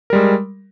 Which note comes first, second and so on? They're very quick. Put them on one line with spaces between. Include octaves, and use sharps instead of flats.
A#4 G3 G#3